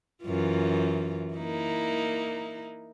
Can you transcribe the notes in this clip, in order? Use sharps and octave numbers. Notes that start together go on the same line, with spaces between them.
F#2 E3 F4
A#3 D#4 E4